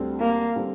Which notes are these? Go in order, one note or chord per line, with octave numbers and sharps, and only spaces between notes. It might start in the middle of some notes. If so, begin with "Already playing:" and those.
Already playing: D2 D3 G3 C4
A#3
D3 G3 C4